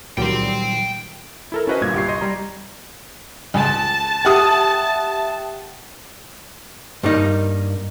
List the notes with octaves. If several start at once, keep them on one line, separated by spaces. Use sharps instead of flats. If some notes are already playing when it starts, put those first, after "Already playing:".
C#2 A#2 D#3 F#3 G3 G5 C6
E4 A4 A#4
C#4 E4 F#4 B4 C5 D#5
G1 G2 A#2 G#6
C2 G4 C#6 C7
D#5 C6
G3 A#5
C#2 A5
G4 E5 F#5 G5 D#6
G2 G3 A#3 D#4